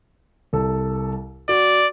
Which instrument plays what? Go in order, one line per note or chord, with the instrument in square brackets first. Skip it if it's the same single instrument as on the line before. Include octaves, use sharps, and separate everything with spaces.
[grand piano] C2 A4
[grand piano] F#4 [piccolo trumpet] D5